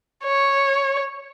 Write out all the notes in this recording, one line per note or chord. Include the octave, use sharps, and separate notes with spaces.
C#5